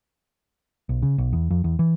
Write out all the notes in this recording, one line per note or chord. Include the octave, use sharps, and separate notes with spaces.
B1
C#3
B1
E2
F2
E2
E3